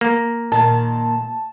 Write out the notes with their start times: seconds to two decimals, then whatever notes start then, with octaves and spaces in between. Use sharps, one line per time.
0.01 A#3
0.52 A#2 D#3 A5